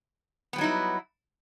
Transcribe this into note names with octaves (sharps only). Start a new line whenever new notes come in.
F#3 G3 B3 D#4 E4